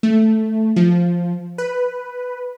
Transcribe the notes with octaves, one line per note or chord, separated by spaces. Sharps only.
A3
F3
B4